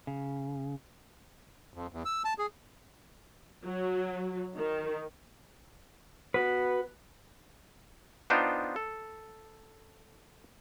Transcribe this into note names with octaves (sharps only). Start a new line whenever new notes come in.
C#3
F2
E2
E6
A5
G#4
F#3
D#3
B3 F#4 B4
B3 D4 D#4 F4 C5 G5
A4